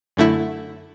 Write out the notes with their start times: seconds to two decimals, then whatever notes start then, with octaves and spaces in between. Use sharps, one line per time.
0.17 F#2 D3 A3 E4